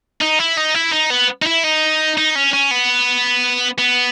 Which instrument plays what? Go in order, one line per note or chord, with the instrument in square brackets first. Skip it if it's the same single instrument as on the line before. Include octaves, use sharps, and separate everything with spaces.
[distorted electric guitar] D#4
E4
D#4
E4
D#4
B3
D#4
E4
D#4
D#4
C#4
C#4
B3
B3